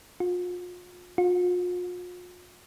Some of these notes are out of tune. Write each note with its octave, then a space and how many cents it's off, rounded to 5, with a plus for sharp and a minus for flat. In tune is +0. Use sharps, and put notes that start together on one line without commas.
F4 +35
F4 +40